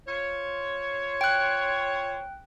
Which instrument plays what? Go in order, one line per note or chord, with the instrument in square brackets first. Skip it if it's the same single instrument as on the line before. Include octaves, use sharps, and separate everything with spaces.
[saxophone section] F4 C5 C#5
[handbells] G5 F#6